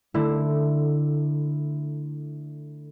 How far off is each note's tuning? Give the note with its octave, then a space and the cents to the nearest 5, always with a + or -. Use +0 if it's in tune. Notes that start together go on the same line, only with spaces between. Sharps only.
D3 +10 A3 +0 E4 +0